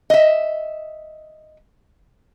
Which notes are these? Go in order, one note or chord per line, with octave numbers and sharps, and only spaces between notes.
D#5 E5